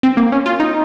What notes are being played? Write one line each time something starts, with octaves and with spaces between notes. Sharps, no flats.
C4
A#3
C#4
F4
D#4